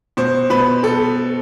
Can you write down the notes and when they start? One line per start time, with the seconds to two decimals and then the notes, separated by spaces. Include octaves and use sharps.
0.17 B2 C5
0.50 B2 B4
0.83 B2 A4